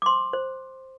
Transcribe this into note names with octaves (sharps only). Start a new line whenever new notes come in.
D6
C5 C6
C5